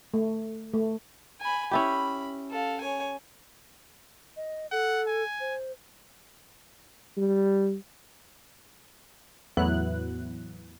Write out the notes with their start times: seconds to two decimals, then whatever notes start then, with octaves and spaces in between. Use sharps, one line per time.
0.14 A3
0.73 A3
1.41 G#5 B5
1.71 C#4 E4 G4 B5
2.51 A4 F5
2.81 C#5 G#5
4.37 D#5
4.72 A4 F#5
5.07 G#5
5.40 C5
7.18 G3
9.57 E2 A2 F#3 B3 E4 F#6